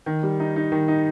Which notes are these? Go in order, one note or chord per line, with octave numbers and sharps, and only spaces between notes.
D#3
G3
D#4
D#4
D#3
D#4